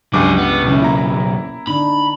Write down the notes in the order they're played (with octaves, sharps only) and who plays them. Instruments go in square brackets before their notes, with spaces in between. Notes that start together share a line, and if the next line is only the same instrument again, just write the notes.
[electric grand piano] C#2 G2 D6 [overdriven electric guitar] F#3 G#4
[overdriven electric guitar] B3
[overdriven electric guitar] B1 C#3 [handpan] E3 C#4 E4
[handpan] A#3 [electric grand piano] E4 A#5
[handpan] D3 D4 D#4 [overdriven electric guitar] B5